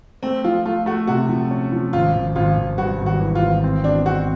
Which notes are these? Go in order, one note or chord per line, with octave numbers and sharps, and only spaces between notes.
A3 C4
F3 F4
A3 F4
A3 F#4
C3 F#4
F3
C#4
F3
G#1 F4
G#1
G#1 F4
G#1
G2 F#4
G#1
F#4
E3
F4
G#1
C4
B2 D4
C4 F#4